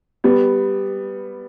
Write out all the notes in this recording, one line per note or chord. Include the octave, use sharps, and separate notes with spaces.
G3 B3